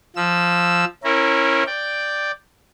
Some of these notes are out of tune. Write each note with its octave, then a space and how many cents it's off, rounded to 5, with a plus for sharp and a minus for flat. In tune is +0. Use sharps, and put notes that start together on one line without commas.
F3 +0 E6 +0
C#4 -30 E4 +0 A#4 -10
D5 +5 G5 +0